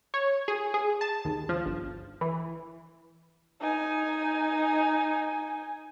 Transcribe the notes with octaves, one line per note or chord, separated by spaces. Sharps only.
C#5
G#4
G#4
A5
D#2
F3
G1
E3
D#4 G#5